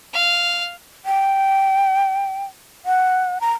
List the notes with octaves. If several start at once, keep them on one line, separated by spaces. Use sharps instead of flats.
F5
G5
F#5
A#5